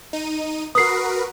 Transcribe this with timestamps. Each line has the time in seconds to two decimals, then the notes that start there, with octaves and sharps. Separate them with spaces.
0.13 D#4 D#7
0.75 F#4 A#4 B4 D#6 C7